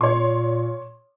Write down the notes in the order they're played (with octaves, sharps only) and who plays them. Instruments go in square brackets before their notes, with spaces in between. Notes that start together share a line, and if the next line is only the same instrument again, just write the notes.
[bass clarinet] A#2 [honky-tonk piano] C#5 C6